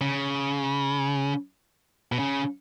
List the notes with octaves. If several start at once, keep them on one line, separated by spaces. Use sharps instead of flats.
C#3
B2
C#3